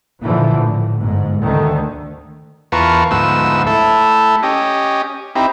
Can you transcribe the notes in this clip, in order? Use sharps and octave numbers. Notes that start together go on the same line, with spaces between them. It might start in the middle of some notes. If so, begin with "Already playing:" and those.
A#2 D3 E3 F3
A2
G1 G#2
D2 D3 D#3
E2 F4 A#4 B4 A5 C#6
D2 G#2 F3 B3 E6
A3 E4 A4
C#4 G4 D#5
C4 D#4 E4 G4